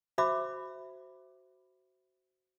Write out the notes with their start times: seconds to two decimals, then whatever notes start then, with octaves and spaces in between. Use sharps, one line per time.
0.18 F#4 C5 E5 B5 D6